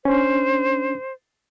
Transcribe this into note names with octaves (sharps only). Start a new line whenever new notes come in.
C#4 D4 C5